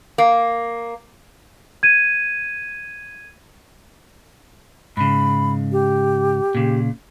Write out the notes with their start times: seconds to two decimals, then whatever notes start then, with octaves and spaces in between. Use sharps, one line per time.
0.18 A#3
1.83 G#6 D#7
4.97 G#2 C#3 B5
5.72 G4
6.55 A#2 C#3